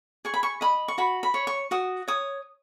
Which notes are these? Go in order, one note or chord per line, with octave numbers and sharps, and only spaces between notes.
G#4 C#6
B5
C#6
D#5 B5
C#6
F#4 B5
B5
C#5
C#6
F#4 D#6
C#5 D#6